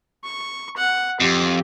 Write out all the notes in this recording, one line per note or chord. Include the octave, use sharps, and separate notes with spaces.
C#6
F#5
F2 G4